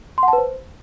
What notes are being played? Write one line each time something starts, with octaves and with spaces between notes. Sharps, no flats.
C6
F#5
A5
B4
C5